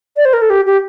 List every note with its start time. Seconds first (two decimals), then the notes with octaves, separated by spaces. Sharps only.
0.17 D5
0.25 C5
0.33 A#4
0.42 A4
0.50 G4
0.66 G4